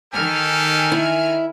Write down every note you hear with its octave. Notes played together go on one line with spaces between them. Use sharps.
D#3 G4 A4 G#5 F6
E4